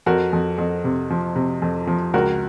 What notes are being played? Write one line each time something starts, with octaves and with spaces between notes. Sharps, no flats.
F2 F#4 A#4
F2
F2
C3
F3
C3
F2
F3
C#2 F#4 A#4